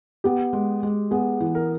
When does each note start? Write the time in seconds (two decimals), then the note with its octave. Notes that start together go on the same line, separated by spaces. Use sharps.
0.24 B3 G4
0.53 G#3
0.83 G#3
1.11 B3 G#4
1.40 E3
1.55 A#4